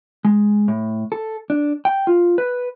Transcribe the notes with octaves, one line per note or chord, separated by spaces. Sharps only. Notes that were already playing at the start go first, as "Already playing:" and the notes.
G#3
A2
A4
D4
G5
F4
B4